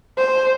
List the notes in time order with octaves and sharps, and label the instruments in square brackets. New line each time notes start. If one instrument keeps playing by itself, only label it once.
[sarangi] C5